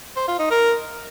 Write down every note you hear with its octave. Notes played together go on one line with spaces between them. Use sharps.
C5
F4
D#4
A#4